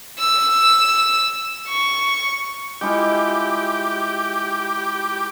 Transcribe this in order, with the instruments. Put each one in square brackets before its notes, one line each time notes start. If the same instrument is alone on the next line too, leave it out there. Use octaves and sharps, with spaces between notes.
[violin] E6
C#6
[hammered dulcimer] G#3 E4 F4 [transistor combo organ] G4